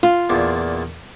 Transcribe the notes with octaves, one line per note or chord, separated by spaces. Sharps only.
F4
E2 A#2 D4